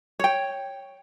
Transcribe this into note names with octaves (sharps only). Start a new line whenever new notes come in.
C#5 G5